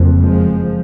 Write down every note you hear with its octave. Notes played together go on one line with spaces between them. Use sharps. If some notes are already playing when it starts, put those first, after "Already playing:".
Already playing: F#1 F2
F3 G#3